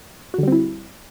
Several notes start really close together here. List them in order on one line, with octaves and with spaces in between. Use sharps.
F#4 D3 G3 C4 E4